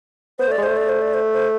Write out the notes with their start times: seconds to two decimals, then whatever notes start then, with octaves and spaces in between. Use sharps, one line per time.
0.39 B3 C5
0.48 A3 D5
0.58 G#3
0.63 A3 C5
0.77 D5
0.89 C5
1.02 D5
1.14 C5
1.33 C5